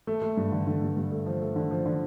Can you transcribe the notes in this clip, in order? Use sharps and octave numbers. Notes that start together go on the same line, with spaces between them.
A3
A3
G2
D3
D3
G2
G2
A3
F3
A3
D3
F3
D3